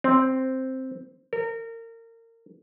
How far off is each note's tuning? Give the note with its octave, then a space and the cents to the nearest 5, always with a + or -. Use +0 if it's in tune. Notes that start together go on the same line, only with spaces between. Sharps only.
C4 +0
A#4 -30